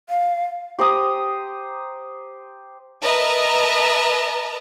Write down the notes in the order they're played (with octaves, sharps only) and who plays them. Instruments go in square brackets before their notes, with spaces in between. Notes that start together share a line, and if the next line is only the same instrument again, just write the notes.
[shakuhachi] F5
[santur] G4 C5 A#5 D#6
[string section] A#4 B4 D#5 E5 A5 A#5